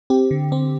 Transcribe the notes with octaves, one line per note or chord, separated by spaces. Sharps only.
C4 G4
D3
C4